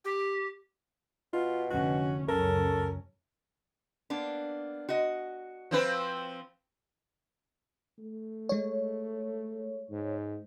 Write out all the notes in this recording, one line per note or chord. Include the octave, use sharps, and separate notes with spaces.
G4
B2 F4
F1 D3 C#4 F#4
C#2 F#2 C#4 A4 A#4
A#3 B3 D4
F#4 D#5
F3 C4 B4
A3
G#3 C#5
G#2